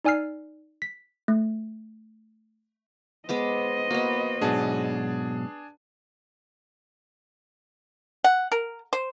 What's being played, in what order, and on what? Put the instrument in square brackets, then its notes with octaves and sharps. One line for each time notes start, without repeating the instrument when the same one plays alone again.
[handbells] D#4 D5 G#5 E6 F6 C7
B6
A3
[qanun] G#3 B3 D6 [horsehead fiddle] C5 D#5
[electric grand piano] A#3 [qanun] B3 F#4
[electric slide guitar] G#2 B2 F#3 [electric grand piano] D4 G#4 A5
[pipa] F#5
A#4
C5